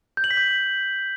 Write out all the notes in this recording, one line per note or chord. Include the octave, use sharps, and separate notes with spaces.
G6
F#7
B6
G6